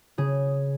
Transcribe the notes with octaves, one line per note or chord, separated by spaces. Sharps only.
C#3 G#4